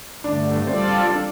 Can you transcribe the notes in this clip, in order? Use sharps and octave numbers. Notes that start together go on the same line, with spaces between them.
G2 D3 A3 D4
G3 C4 F4 A4 D5
D4